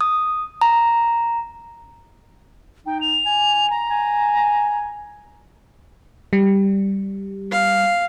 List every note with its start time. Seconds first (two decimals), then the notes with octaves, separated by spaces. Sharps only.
0.01 D#6
0.61 A#5
2.86 D#4 G5
3.01 F7
3.26 G#5
3.70 A#5
3.90 G#5
6.33 G3
7.51 F5